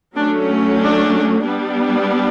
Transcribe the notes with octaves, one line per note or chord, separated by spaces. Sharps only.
F#3 A3 C#4 D4
D4
G3 B3 D4